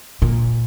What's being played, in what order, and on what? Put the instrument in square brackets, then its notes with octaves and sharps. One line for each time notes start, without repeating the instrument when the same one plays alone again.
[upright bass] A#2